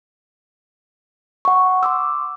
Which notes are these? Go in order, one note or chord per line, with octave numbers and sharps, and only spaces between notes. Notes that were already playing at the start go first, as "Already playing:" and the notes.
F#5 C#6
C6 D6 E6